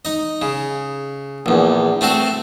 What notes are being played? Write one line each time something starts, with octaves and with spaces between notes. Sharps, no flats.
D#4 D#5
C#3
A#1 E2
A3 C4 F#4 A4